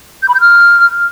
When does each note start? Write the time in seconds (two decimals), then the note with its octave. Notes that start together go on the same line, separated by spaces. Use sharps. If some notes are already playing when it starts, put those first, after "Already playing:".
0.22 G6
0.28 B5
0.34 G6
0.40 F6